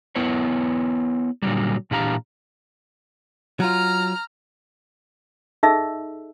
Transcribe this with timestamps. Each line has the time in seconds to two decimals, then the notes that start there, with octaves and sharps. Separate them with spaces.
0.16 B3 E4 B4 C#5
1.42 A#2 D3 F#3 G3
1.91 A#2 E3 D4 G4 F5 A#5
3.60 F#3 F4 A#5 F6
5.63 D#4 G#4 A4 D#5 E5 E6